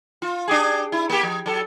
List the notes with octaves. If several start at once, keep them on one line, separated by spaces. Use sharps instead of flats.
F4
D4 G4 G#4
E4
A#3 G4
F3
F#3 A4